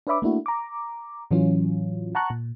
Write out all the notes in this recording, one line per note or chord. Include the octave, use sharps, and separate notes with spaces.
D4 B4 C#5 E5 B5 D6
A3 A#3 D4 E4 F#4
A#5 D6
A2 E3 F#3 C#4 F4
F#5 A5 A#5 C#6 F#6
A#2